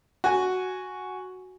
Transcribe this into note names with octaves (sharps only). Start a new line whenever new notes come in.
F#4 G#5